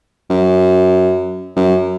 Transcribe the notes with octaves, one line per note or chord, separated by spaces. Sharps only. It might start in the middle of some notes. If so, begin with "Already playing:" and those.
F#2
F#2